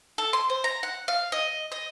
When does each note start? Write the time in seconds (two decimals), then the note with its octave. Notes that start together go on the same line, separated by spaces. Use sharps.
0.18 A4
0.33 C6
0.50 C5
0.64 A#5
0.83 F#5
1.08 F5
1.32 D#5
1.72 D#5